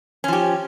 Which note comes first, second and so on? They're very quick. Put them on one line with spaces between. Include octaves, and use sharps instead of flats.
C#4 F3 G4